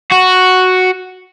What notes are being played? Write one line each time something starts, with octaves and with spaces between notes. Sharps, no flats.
F#4